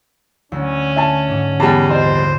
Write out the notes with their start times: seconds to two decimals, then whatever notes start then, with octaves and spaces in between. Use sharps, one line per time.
0.52 D2 C#4
0.96 E5 G#5 A5
1.28 G#2 D3
1.60 E2 G3 A5
1.90 D#1 C5 D5 D#5